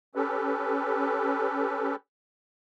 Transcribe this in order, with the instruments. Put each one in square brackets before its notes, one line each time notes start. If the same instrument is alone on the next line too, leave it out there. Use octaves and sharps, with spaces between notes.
[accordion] C#4 G4 A4 B4